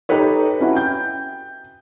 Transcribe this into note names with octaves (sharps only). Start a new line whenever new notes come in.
D#4 G4 A4 B4 C#5
C#4 E4 F#4
G5 G6